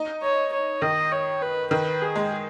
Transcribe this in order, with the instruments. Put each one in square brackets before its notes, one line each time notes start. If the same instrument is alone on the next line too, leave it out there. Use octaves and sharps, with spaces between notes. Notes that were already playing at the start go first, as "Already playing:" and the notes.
Already playing: [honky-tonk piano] D#4
[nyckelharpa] C#5
C#5
[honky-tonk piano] D#3 [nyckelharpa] D#5
[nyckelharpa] C#5
B4
[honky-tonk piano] D#3 [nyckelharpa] B4
[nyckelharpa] G#4
[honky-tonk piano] G#3